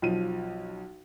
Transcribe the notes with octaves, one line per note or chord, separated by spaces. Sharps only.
B1 F3 D#7